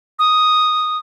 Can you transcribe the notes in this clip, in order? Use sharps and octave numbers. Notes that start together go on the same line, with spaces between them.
D#6